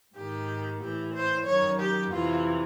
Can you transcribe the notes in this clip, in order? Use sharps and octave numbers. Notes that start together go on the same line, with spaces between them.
G#2 D#3 G4
A2 E3 G4
C5
F#2 D#3 C#5
G4
F2 C3 E3 F4